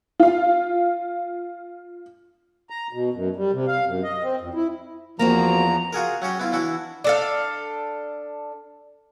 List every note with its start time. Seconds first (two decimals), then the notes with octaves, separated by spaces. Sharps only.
0.20 F4 F5
2.70 A#5
2.93 B2
3.14 F#2
3.36 G3
3.53 C3
3.68 F5
3.86 F#2
4.04 D#5
4.23 C4
4.40 F2
4.54 E4
5.19 E2 F3 A#3 C4 F#4 A#5
5.93 F4 F#4 G#4 A#4
6.22 F#3 C#4 F#4 G4
6.39 B3 E4 F4
6.53 E3 D4 E4 F#4
7.04 D4 A4 F5